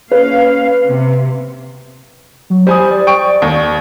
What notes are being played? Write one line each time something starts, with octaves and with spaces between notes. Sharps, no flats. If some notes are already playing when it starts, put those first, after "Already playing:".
A#3 C#4 B4 F5
C3
F#3
G3 C5 G#5 D#6
D5
G5 C#6 D7
D#2